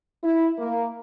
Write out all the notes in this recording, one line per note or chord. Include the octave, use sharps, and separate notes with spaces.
E4
A#3